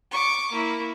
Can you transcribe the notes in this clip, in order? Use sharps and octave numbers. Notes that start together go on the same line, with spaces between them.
C#6 D6
A#3 E4